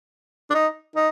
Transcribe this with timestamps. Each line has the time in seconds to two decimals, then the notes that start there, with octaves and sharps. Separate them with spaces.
0.50 D4
0.54 D#4
0.96 D#4